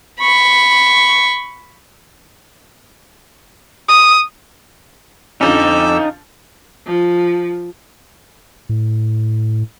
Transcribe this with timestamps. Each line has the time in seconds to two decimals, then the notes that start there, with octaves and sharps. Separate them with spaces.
0.21 B5 C#6
3.88 D#6
5.41 F2 D3 F3 C#4 D#4 D6 E6
6.87 F3
8.69 A2